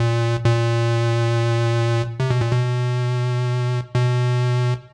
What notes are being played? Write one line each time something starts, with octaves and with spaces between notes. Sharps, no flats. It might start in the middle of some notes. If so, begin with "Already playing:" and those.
Already playing: A#2
A#2
C3
B2
A#2
B2
B2